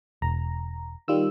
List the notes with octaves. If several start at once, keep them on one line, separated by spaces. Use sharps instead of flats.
E1 A#5
D#3 G3 F4 E6